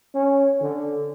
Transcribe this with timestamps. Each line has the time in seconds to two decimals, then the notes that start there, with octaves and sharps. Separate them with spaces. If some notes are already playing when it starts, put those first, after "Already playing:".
0.14 C#4
0.61 D3